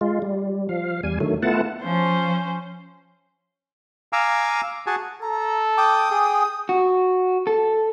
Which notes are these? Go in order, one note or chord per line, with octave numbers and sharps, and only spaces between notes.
G#3 F4
G3
F3 F5
E2 G3 G#5
D3 D#3 F#3 A3
A3 B3 E4 F4 F#5 A5
F3 C#4 C5
F5 G#5 A#5 D6 E6
F#4 G#4 G#5 A5
A4 A#5
G5 D6 D#6
G#4 G5
F#4
A4